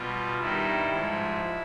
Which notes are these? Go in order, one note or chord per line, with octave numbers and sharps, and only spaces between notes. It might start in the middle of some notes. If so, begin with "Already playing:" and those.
Already playing: B2 G3 F4
G2 D#3 G3 E4
G#2 F3 G#3